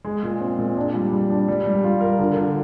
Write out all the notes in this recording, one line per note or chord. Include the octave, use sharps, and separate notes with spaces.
G#3
A#2
C4
A#2
D4
G3
G3
D4
G3
G3
F4
A#4
D3
D3